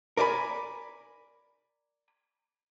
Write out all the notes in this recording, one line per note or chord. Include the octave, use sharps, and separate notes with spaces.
A#4 D5 G#5 B5